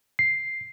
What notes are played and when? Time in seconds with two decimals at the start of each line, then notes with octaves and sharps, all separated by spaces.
0.19 C7